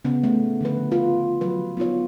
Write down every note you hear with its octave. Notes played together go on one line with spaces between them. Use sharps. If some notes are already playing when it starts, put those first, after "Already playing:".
C#3 B3 C#4
A3
D3 F3 B4
F4 B4
F3 F#3 B4
B3 D#4 F4 C#5